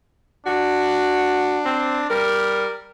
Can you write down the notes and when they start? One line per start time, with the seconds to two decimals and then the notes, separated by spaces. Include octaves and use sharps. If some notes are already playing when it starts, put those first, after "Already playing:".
0.46 D4 F#4
1.66 C4
2.10 G3 A#4